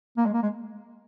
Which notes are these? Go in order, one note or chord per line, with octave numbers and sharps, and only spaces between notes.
A#3
G#3
A#3
G#3